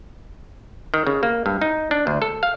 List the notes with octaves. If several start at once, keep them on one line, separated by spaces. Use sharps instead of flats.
D#3
C#3
A#3
G2
D#4
D4
D2
A4
F5